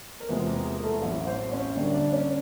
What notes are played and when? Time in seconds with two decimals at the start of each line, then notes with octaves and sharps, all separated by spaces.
0.20 A#4
0.28 E2 C3 F3 G#3 B3 C4 B4
0.47 A#3 A#4
0.65 G#4
0.77 A#4
0.83 A3 A4
1.02 A1 A2 F#3
1.26 C4 C5
1.51 C#4 C#5
1.75 D2 D3 G3 A#3 D4 D5
1.94 D4 D5
2.12 C#4 C#5